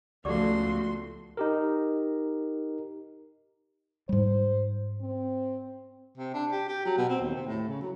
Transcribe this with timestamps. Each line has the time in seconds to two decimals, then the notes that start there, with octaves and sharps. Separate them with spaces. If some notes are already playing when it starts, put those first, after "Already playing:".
0.25 C#2 F3 A3 F#4 G4 D5 C6 D6
1.37 D#4 G4 A#4
4.09 G#2 G3 C5
5.01 C4
6.17 C3
6.33 D4
6.51 G4
6.68 G4
6.85 F#3
6.97 B2
7.09 C4
7.22 D#2
7.34 C3
7.47 A2
7.68 C#3
7.81 F#3